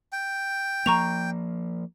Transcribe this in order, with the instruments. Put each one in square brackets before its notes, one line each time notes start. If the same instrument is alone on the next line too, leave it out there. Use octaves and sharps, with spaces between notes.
[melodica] G5
[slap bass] F3 A#3 [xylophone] A#5 C#6 F7